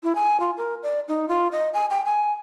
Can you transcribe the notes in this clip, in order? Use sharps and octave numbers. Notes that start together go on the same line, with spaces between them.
E4
G#5
F4
A#4
D5
D#4
F4
D#5
G#5
G5
G#5